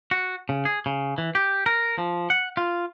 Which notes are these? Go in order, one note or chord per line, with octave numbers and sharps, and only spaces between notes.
F#4
C#3
G#4
C#3
E3
G4
A#4
F3
F#5
F4